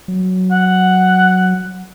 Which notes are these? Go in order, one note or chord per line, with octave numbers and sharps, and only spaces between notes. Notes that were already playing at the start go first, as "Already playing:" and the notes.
F#3
F#5